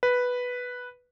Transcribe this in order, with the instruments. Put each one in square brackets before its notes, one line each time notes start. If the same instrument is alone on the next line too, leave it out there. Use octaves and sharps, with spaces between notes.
[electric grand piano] B4